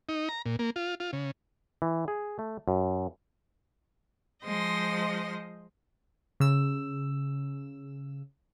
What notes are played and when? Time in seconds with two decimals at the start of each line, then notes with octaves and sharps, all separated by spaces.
0.09 D#4
0.29 A#5
0.46 A#2
0.59 A#3
0.76 F4
1.00 F4
1.13 C#3
1.82 E3
2.08 G#4
2.39 A3
2.68 F#2
4.44 F3 G#3 C5 D#5 C6
6.40 C#3 E6